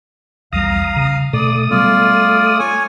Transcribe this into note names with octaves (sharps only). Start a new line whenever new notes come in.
B1 E2 G3 F5 A#5 D#6
C#3
B2 A3 D5 D#6
F#3 G3 B3 F4 D5
C#5 G#5